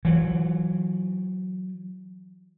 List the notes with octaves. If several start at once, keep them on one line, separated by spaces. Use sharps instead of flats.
E3 F#3